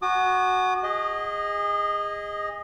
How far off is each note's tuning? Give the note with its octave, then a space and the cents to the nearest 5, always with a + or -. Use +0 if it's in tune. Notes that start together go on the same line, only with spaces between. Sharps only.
F#4 +0 G#5 +40 D#6 -45
G#4 -30 D#5 +0